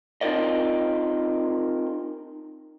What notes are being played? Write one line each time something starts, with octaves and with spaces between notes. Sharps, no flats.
C4 D#4 F4 A#4 D5 D#5